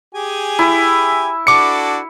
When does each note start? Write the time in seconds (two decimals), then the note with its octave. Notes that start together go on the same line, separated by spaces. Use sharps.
0.15 G4 G#4 G#5
0.59 E4
1.47 D4 F#4 A4 D6 C#7